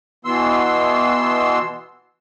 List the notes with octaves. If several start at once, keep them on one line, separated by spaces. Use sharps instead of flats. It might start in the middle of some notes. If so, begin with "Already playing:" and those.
B2 E3 B3 C6 E6